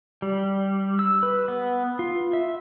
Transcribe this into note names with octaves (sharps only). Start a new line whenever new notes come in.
G3
E6
B4
B3
F4
E5